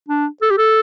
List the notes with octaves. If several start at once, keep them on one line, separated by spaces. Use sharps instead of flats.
D4
A4
G4
A4